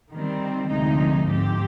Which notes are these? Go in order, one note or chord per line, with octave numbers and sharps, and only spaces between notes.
D#3 G3 C4
D2 C3 F3 G#3 D#4
G#2 F3 C4 G4